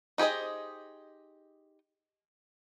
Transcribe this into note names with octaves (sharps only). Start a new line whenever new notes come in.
D#4 G4 G#4 C5 D#5